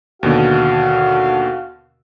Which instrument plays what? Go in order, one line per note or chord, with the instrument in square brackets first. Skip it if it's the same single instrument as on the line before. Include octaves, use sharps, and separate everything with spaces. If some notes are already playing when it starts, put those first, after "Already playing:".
[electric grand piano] D#2 B2 D3 [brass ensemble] F#4 F5